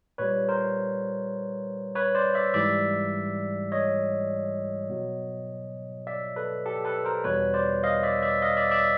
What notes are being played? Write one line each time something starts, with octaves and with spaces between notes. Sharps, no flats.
A#2 G3 B4 C#5
A#4 C5
B4 C#5
C5 D5
D5 E5
G#2 E3 G3 D5 E5
C#5 D#5
B2 F#3
D5 E5
A4 B4
G4 A4
A4 B4
A#4 C5
E2 B2 G3 B4 C#5
C5 D5
D#5 F5
D5 E5
D5 E5
D#5 F5
D5 E5
D5 E5